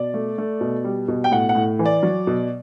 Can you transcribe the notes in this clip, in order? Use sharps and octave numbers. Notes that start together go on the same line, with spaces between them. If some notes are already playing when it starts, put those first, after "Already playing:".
Already playing: B2 D5
A3
A3
B2
G3
B2
G5
A2 F#5
F#5
A2
E3
D5
F#3
B2